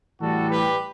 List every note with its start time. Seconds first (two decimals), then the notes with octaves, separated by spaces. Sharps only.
0.19 A2 E3 G3 F#4 A4
0.49 G4 B4